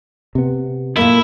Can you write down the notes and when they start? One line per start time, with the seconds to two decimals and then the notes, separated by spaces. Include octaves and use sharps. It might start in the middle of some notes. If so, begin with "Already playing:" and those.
0.35 C3 B3
0.97 A#2 A3 A#3 E4